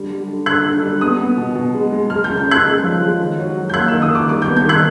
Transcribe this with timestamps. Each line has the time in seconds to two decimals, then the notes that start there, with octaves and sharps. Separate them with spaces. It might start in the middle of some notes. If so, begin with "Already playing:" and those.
Already playing: D3 G3
0.10 G3
0.28 D3
0.46 D3 F#6
0.65 D3
0.83 G3
1.01 B3 D#6
1.20 B3
1.37 B2
1.55 B2
1.74 G#3
1.92 G#3
2.10 G#3 F6
2.24 G6
2.29 C#3
2.37 G6
2.47 C#3 F#6
2.65 G#3
2.83 F3
3.01 G#3
3.19 D#3
3.38 F#3
3.57 F#3
3.69 G6
3.74 A#3 F#6
3.88 E6
3.92 D#3
4.02 D#6
4.10 D#3 D6
4.29 G3 D6
4.42 G6
4.47 B3
4.57 G6
4.66 D#3 F#6